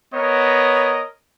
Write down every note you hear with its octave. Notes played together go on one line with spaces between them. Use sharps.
B3 A#4 C#5 D#5